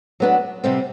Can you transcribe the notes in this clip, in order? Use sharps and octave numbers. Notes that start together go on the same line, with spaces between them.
F#3 B3 D4
C3 G3 C4